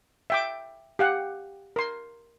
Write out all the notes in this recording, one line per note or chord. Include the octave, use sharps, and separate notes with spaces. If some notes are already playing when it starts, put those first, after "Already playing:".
E5 G5 D6
G4 F5 F#5
A#4 C6